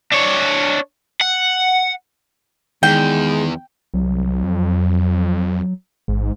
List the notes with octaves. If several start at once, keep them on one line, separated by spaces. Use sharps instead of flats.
D4 C#5
F#5
E2 D#3 G#3 G5
C2 F#3
F2
A1 G#2